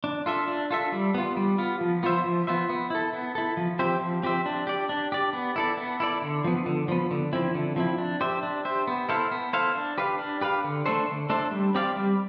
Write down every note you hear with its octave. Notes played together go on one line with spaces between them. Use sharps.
D4
F4 A4 E5
D4
F4 A4 E5
G3
B3 F4
G3
B3 F4
F3
B3 F4 C5 E5
F3
B3 F4 C5 E5
B3
E4 A4
B3
E4 A4
F3
C4 G4 C5 E5
F3
C4 G4 C5 E5
D4
G4 D5
D4
G4 D5
B3
E4 A4 D5
B3
E4 A4 D5
D3
F3 B3
D3
F3 B3
D3
F3 C4 E4
D3
F3 C4 E4
D4
G4 C5 E5
D4
G4 C5 E5
B3
E4 A4 C5 F5
B3
E4 A4 C5 F5
D4
G4 B4 F5
D4
G4 B4 F5
D3
A3 D4 A4 C5
D3
A3 D4 A4 C5
G3
C4 G4 D5 F5
G3